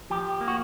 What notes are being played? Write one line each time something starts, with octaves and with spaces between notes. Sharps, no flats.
F3 G4
A#3
F#4